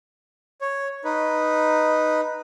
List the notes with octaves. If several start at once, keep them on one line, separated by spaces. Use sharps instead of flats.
C#5
D#4 B4